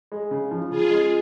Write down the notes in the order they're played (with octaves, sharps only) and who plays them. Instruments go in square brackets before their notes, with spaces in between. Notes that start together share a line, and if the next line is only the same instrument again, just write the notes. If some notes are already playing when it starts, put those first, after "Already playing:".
[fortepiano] G#3
C#3
F3
[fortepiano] C#3 [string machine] F4 G#4
[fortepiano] G#3